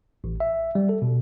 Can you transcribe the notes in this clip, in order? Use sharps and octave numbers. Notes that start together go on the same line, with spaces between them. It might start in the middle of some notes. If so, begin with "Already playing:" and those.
A1
E5
G3
A4
B2